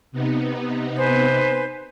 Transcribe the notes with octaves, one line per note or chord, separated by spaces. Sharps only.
C3 B3 D#4
B4 C5 G#5